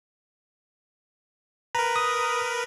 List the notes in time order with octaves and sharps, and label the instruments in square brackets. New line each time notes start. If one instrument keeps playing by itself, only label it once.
[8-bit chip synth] A#4 B4 [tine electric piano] A#5
[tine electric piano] D#6